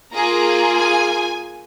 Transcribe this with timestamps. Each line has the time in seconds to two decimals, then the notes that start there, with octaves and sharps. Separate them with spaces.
0.13 A#3 F4 G#4 A#5
0.79 G#5